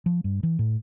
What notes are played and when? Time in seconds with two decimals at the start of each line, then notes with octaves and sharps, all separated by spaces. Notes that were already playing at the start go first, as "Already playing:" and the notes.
0.06 F3
0.24 G2
0.43 E3
0.59 A2